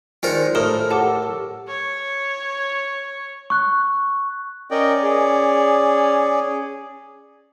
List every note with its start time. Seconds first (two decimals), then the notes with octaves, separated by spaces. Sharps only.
0.23 D#3 G#3 F4 A#4 C5 D5 C#7
0.55 A2 A#4 D#6 E7 G7
0.90 G4 A4 A#4 F#5 A5 D6
1.67 C#5
3.50 C#6 F#6
4.71 C#4 A#4 D5 D#5 G5
5.03 G#4